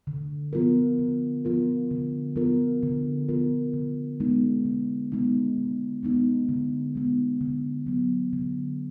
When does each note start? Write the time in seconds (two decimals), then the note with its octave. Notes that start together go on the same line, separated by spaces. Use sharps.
0.07 D3
0.53 F3 B3 F4 A#4
0.99 D3
1.45 F3 B3 F4 A#4
1.91 D3
2.36 F3 B3 F4 A#4
2.83 D3
3.29 F3 B3 F4 A#4
3.73 D3
4.20 G#3 B3 D#4
4.65 D3
5.12 G#3 B3 D#4
5.58 D3
6.03 G#3 B3 D#4
6.49 D3
6.95 G#3 B3 D#4
7.41 D3
7.86 F#3 B3
8.33 D3